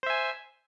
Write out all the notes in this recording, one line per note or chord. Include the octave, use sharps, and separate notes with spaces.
C5 E5 G#5